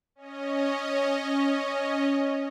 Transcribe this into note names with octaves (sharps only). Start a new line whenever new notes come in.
C#4 D#5